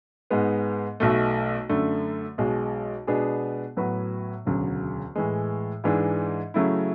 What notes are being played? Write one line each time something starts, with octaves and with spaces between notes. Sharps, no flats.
G#2 G#3 B3
B1 B2 A3
F#2 D3 A3
B1 B2 G#3
B2 G#3 B3 D4 G#4
A2 F#3 B3 F#4 B4
E1 D2 C#3 F#3
A2 E3 G#3
G#2 E3 G#3 D4
C#3 F#3 A3 E4